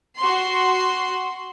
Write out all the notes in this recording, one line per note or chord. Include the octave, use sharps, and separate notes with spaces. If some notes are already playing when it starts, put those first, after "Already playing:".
F#4 C6